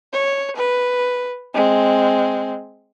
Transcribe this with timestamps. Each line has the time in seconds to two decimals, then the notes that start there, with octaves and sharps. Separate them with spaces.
0.13 C#5
0.56 B4
1.54 G#3 C4